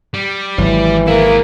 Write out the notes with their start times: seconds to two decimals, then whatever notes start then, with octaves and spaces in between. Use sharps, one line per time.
0.14 G3
0.58 G#1 E3 F#3
1.08 A#3 E4 G#4